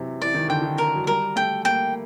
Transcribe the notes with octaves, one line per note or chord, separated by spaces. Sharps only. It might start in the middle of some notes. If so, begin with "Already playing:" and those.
Already playing: C3 E3 F#3
E3 D5
D#3
D3 G5
D#3
A#4
F#3
G3 A#4
A3 G5
A#3 G5